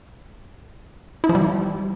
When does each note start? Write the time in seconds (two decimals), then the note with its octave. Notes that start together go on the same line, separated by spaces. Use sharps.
1.24 E4
1.29 F3
1.35 G3